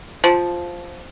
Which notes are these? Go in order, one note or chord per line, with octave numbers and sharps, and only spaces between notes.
F3